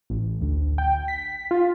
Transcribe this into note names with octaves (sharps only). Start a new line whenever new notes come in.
A1
D2
G5
B6
F4